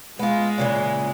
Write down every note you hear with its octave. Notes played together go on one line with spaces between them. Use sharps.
G#3 B3 F4
A#2 C#3 E3